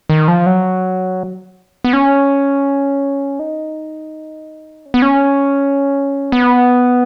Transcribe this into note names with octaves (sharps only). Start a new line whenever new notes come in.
D#3
F3
F#3
B3
C#4
D#4
C#4
B3
C#4
B3